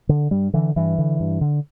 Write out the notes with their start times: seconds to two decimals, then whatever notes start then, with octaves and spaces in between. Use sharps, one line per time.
0.09 D3
0.31 G2 G3
0.54 D3 E3
0.76 G2 E3
0.98 D3
1.20 G2
1.41 D3